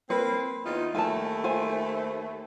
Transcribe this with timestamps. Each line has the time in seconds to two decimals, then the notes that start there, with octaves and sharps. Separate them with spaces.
0.10 A#3 C4 B4
0.65 E2 D#4 F4
0.95 D#2 A3 G#5 A5
1.44 C5 G#5